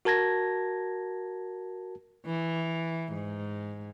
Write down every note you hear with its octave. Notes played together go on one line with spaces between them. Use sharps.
F#4 A#4 A5 G#6 A#6
E3
G#2